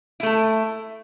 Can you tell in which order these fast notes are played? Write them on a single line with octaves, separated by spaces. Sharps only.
E4 A3 A4